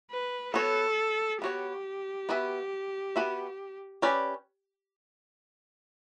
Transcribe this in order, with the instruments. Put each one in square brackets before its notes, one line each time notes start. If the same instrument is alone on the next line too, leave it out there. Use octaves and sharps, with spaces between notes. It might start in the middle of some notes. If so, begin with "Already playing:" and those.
[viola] B4
[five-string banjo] B3 F#4 C#5 [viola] A4
[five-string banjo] B3 F#4 C#5 [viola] G4
[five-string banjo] B3 F#4 B4 E5
B3 F#4 B4 E5
C#4 G4 B4 D5